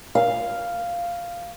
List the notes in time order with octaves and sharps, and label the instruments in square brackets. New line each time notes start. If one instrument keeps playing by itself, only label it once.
[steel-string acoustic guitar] F5